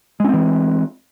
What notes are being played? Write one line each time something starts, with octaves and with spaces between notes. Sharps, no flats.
E3 G#3 C4 C#4